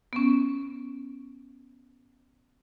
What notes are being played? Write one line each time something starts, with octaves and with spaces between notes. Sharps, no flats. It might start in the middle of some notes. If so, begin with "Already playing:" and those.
B3 C#4